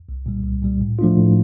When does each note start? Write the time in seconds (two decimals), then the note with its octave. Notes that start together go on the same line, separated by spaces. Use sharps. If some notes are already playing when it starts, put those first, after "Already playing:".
0.09 C2
0.26 A#2 G3
0.44 C2
0.62 A#2 G3
0.81 A2
0.99 F3 A3 D4 F4
1.18 A2